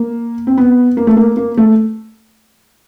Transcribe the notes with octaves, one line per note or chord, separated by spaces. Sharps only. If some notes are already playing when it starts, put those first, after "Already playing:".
Already playing: A#3
C4
B3
A#3
A3
A#3
A#3
A3